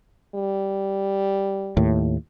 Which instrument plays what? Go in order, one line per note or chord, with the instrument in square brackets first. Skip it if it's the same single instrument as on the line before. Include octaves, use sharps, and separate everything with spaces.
[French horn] G3
[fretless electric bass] D#2 A2